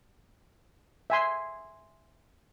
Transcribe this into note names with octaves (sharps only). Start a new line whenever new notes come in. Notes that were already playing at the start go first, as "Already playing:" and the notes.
E5 G#5 C6